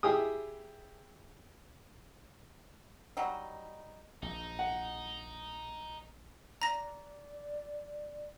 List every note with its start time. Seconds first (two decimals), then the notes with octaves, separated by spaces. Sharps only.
0.03 E4 G4 G#4 G5 D#6
3.17 F#3 G3 D#4
4.22 A#1 D#4
4.59 F#5
6.62 D5 A#5 A#6